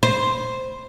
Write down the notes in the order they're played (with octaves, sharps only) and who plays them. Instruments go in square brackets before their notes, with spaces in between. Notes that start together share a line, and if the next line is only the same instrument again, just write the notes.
[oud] C5